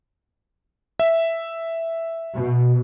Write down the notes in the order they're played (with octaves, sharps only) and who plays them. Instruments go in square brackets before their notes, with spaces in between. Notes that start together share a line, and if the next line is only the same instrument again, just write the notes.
[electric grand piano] E5
[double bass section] B2